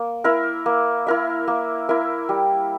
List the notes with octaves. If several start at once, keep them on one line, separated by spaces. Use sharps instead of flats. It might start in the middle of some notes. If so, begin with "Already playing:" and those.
Already playing: A#3
E4 A#4 E5
A#3
E4 A#4 E5
A#3
E4 A#4 E5
G3